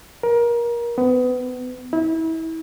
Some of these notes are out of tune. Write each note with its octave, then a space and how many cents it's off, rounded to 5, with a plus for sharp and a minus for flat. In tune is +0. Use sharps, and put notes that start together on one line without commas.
A#4 +25
B3 +25
E4 -30